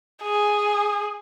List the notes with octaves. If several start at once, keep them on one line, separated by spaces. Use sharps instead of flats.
G#4